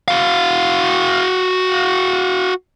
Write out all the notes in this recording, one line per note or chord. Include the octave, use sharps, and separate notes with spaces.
F#4 F5